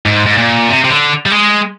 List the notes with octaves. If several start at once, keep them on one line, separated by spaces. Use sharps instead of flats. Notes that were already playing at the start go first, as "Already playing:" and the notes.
G#2
G#2
A#2
C3
C3
D3
G3
G#3